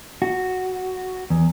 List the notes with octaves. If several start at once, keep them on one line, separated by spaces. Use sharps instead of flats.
F#4
E2